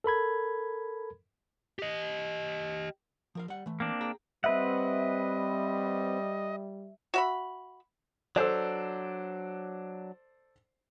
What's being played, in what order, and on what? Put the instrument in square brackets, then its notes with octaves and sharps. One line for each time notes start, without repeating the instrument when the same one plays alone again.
[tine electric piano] A4 A#4 B5 G#6
[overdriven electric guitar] G4 D#5
[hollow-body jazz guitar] F3 A#4 F5
G3 F#5
E3 A3
[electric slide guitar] A#3 C4 D4
[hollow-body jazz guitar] G#4 G5 A#5
[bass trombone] G3 [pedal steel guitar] C4 B4 F#5 [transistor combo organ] D#5 [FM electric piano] E5
[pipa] F#4 E5 B5
[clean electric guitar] F#3 D4 [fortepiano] A4 C5 D5